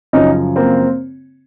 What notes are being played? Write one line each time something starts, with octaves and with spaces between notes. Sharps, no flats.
F#2 C#3 F3 C#4 D#4
A#3 C4